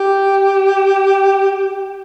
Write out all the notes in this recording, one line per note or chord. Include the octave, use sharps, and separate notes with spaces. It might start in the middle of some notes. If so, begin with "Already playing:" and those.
Already playing: G4